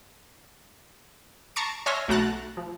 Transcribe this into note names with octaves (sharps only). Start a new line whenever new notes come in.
A5 A#5 C#6 C7 D7
C#5 E5 G#5 C6 F6 A#6
B1 A3 F#4 A#5 F#6 A6
F3